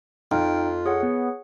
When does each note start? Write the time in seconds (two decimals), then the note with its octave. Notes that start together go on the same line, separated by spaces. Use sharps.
0.31 F2 D#4 F4 G5
0.86 G#4 C#5 F#5
1.03 B3